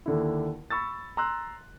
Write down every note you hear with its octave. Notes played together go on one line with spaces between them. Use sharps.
D#2 D3 E4
B5 C#6 E6 A6
A#5 C6 E6 F#6